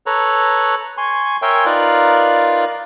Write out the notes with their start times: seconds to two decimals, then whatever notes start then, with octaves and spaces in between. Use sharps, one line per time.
0.06 A4 B4 C#5 A#5
0.98 G#5 C6 C#6
1.42 A#4 C#5 E5 G5 G#5 C6
1.66 D#4 F4 A#4 B4 D5 F5